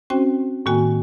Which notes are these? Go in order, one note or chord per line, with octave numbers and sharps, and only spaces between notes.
C4 C#4 F#4 C5 G5
A2 D#3 A#3 F#4 G5 G#5